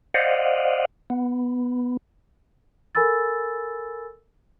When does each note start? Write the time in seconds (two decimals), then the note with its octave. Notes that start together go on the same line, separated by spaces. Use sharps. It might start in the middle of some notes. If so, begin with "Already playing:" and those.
0.14 C5 D5 D#5 F5 F#5
1.10 B3
2.95 A4 A#4 G#5 B5 E6 A6